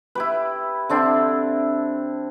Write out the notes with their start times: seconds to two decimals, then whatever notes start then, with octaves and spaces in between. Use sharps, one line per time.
0.15 E4 G4 B4
0.89 D3 C4 D4 E4